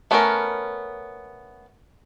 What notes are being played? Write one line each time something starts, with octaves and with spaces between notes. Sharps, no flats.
A3 B3 C#4 F#4 A#4